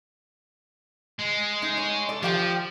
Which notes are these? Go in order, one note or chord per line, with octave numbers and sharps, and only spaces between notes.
G#3
D#4
C#5
A4 D5
F3 G4 F5 G5